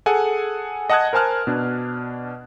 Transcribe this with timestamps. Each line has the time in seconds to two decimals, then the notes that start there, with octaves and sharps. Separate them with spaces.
0.06 G#4 A4 F#5 G#5
0.90 D#5 F#5 A5 D#6 F#6 G#6
1.13 A#4 C5 G#5 A5 F6 F#6
1.47 B2 D4